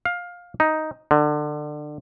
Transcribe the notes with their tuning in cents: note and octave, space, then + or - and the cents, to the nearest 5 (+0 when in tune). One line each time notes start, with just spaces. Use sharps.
F5 +15
D#4 +5
D3 +25